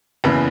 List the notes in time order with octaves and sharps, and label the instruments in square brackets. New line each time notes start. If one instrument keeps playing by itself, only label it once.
[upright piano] F#1 E2 C#3 E3 B4